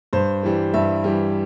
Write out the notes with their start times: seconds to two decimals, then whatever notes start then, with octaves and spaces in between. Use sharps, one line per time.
0.13 G2 C5
0.43 E3 G3
0.74 G2 E5
1.04 E3 G3